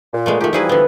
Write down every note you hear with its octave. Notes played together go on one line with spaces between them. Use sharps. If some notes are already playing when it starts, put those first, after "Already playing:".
A#2
G#3 A3 B3
A#2 D#3 A3 F4 G4
E3 F3 G3 D#4 E4 G#4 B4
D3 B3 B4